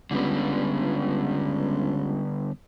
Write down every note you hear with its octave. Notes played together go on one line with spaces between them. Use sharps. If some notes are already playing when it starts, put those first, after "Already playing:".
C#2 D3 G3 B3